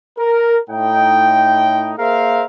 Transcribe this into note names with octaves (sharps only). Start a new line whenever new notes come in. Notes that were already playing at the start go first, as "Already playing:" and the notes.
A#4
A2 D#4 G5
A#3 G#4 A#4 C5 E5 F5